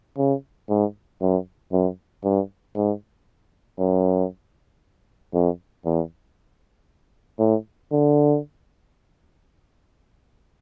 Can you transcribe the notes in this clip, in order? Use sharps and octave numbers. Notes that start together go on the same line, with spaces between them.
C#3
G#2
F#2
F#2
G2
G#2
F#2
F2
E2
A2
D3